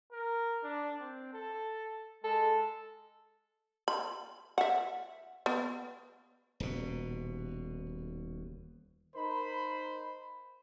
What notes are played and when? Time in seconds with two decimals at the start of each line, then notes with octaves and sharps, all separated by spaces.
0.12 A#4
0.63 D4
1.00 C4
1.33 A4
2.24 G#3 A4
3.88 B5
4.58 E5 F#5
5.46 B3
6.60 D#1 B2
9.15 D#4 A#4 C5 B5